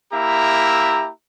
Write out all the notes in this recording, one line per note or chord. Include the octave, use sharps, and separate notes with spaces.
A#3 E4 G4 E5 A#5